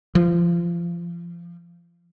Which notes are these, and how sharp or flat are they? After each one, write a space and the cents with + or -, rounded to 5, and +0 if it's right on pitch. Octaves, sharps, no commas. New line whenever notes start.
F3 -25